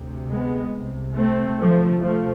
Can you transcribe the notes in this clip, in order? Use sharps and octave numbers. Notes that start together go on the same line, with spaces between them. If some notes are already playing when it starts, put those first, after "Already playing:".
Already playing: D2 C3
G#3 B3
C2 C3
A3 C4
D2 C3 F3 A3
F3 A3